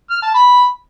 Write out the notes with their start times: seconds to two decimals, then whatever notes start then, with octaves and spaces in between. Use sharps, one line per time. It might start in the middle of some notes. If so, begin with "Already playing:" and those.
0.11 F6
0.22 A5
0.34 B5